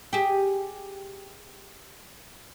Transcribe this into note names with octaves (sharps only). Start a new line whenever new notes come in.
G4 G#4